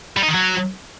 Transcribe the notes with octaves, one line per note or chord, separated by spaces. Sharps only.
G3
D#4
D#3
F#3